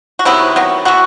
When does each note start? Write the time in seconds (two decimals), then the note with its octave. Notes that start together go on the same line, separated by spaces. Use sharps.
0.19 F#4
0.25 C3 D#3 F#3 B3 E4
0.56 D#3 F#3 B3
0.85 E3 B3 F#4